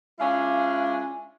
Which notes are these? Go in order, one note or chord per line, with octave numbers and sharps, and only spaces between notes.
G#3 C#4 D4 E4 F4 F5